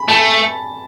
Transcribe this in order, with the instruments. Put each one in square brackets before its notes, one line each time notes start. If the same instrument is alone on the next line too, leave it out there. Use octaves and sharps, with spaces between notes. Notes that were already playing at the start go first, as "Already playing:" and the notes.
Already playing: [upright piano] B5
[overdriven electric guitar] A3 [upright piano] A5